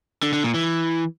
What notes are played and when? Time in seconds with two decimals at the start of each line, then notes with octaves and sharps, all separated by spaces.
0.23 D3
0.33 D3
0.44 A#2
0.54 E3